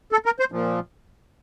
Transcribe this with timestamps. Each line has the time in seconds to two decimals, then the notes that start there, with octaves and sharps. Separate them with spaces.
0.12 A4
0.26 A#4
0.39 C5
0.52 A#2 F3